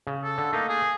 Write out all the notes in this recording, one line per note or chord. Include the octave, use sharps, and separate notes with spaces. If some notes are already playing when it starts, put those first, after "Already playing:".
C#3
A4
D3
A3 A#3 D#4
G#4